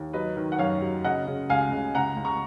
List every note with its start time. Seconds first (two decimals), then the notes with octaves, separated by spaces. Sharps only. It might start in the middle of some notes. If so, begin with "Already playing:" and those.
Already playing: D#2
0.13 F#3 B4 D#5
0.37 D#3
0.52 F#5
0.58 F#2 C#5 F5
0.82 F#3
1.04 C#3 D#5 F#5
1.27 C#3
1.49 C#2 F5 G#5
1.72 C#3
1.95 C#2 F#5 A#5
2.17 C#2
2.25 A#5 C#6